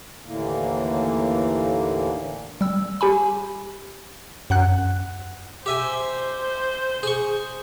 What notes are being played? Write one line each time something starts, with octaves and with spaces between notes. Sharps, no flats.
D#2 A2 D3 E3 A#3
G3 E6
G4 G#5 B5
F#2 F#5 F#6
G4 C5 E5 G#5
G#4 C#6